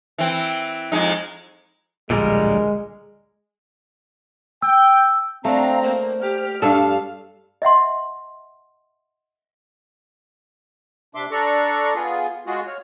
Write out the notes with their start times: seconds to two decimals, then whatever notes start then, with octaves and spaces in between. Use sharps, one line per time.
0.18 E3 C4
0.92 F2 G#3 D#4
2.10 D1 A#1 A#2 D3 G3 G#3 A#4
4.62 G5 E6
5.45 A3 C4 D4 F5 A#5
5.83 A#3 C5
6.22 G4 F6
6.62 G2 D4 A4 F5 A5
7.62 D#5 E5 F#5 C6
11.15 C3 D4 E5 C6 D6
11.31 D4 A4 D5 A#5 C#6
11.95 B3 F4 G#4
12.47 G#3 F4 F#4 G#4
12.67 C#5 F6